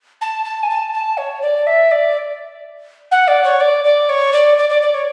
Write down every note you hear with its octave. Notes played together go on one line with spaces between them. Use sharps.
A5
A5
G#5
A5
A5
C#5
D5
E5
D5
F#5
D5
C#5
D5
D5
C#5
D5
D5
D5
D5
C#5